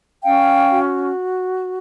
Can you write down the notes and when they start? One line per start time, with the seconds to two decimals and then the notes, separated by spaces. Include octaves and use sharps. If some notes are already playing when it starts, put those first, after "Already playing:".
0.25 C#4 F5 G5
0.71 F#4